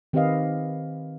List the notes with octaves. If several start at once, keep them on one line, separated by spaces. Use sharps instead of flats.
D#3 C4 G4 B4 D#5 F5